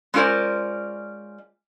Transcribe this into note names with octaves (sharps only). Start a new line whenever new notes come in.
G#3 C#4 F4 A#4 C5 D5